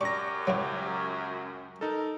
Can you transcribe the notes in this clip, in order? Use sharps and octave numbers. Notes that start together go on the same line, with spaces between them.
F#2 D4 G4 C#6 A#6
C#2 F#3 C4 E4
D#4 A4 A#4